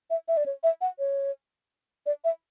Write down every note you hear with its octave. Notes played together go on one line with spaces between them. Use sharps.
E5
E5
D5
C#5
E5
F#5
C#5
D5
E5